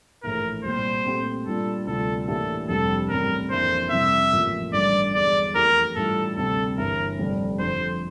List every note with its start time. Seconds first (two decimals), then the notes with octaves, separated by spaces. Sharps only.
0.23 A#1 A2 E3 A#3 A#4
0.64 C2 A#2 G3 C5
1.05 A#2 A3 C4 G4
1.46 A#2 G3 D4 F4 A4
1.87 D2 C3 G3 D4 F4 A4
2.27 A2 E3 A#3 D4 G4 A4
2.68 F1 F2 C3 G3 D4 A4
3.09 A1 A2 G3 C4 A#4
3.50 F2 E3 A#3 D4 C5
3.91 F2 C3 G3 C4 E4 E5
4.32 A1 A2 F3 A#3 F4
4.73 A1 G2 D3 G3 D4 D5
5.14 E1 E2 D3 G3 D5
5.55 F2 E3 A3 E4 G4 A#4
5.96 A2 E3 G3 D4 F4 A4
6.37 D2 C3 G3 C4 A4
6.78 G1 G2 E3 A#4
7.19 F1 F2 D3 G3 D4
7.59 F2 D3 F3 C5